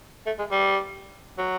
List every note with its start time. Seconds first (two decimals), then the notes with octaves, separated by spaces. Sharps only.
0.26 A3
0.39 G#3
0.51 G3
1.38 F#3